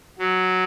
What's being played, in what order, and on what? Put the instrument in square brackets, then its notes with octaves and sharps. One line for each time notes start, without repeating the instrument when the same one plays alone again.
[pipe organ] F#3